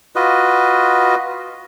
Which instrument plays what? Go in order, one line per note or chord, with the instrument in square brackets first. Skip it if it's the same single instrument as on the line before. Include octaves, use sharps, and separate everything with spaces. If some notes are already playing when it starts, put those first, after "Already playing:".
[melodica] F4 F#4 B4 D#5